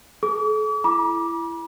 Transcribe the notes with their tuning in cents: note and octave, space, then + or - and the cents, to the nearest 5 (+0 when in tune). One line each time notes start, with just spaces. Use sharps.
A4 -40 D6 -45
E4 +25 B5 -45 D6 +0